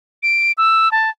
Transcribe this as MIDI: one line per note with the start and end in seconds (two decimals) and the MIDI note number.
0.23 0.52 98
0.58 0.91 88
0.92 1.09 81